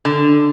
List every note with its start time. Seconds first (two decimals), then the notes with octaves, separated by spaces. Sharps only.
0.05 D3